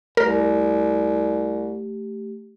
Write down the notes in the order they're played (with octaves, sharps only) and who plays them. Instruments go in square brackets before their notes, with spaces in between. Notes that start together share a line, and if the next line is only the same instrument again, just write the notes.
[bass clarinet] C2 [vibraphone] A3 G4 [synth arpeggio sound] A#4